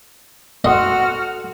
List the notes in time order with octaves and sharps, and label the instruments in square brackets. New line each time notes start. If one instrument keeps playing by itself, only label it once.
[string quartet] F#4 F6 [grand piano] A4 F#5 C6 [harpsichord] D#5